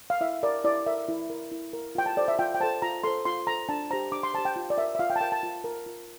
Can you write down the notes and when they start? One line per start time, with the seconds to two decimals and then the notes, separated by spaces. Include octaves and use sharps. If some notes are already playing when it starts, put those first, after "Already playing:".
0.10 F5
0.21 E4 E5
0.43 A#4 D5
0.64 E4 D5
0.86 A#4 E5
1.08 E4
1.30 A#4
1.51 E4
1.73 A#4
1.95 F4 G5
2.06 A5
2.17 A4 C5 D5
2.28 E5
2.39 F4 G5
2.55 G5
2.60 A4 C5 A5
2.82 F4 A#5
3.04 A4 C5 C6
3.25 F4 C6
3.47 A4 C5 A#5
3.69 D4 A5
3.91 G4 C5 A#5
4.12 D4 D6
4.23 C6
4.34 C5 A5
4.38 G4
4.45 G5
4.56 F4
4.70 D5
4.77 A#4 E5
4.95 E5
4.99 F4 F5
5.10 G5
5.16 A5
5.21 A#4 G5
5.32 A5
5.43 F4
5.64 A#4
5.86 F4